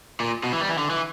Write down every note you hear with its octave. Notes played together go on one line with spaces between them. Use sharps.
A#2
B2
E3
G3
E3
D3
E3